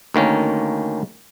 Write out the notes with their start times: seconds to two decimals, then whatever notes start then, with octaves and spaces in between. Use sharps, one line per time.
0.14 D2 D#3 A#3 C#4